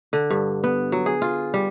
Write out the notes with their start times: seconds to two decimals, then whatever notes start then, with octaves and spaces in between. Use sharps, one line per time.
0.13 D3
0.30 G2
0.64 B3
0.92 F#3
1.06 G#4
1.22 F4
1.54 G3